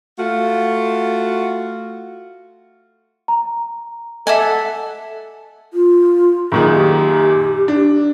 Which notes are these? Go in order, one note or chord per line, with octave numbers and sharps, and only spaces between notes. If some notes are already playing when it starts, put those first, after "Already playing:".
A3 F4 F#4
A#5
A4 D#5 E5 F#5 G#5 D6 B6
F4
F#2 A#2 D#3 G#4
G4
D4